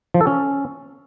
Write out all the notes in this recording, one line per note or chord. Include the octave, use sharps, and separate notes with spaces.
F3
A4
C#4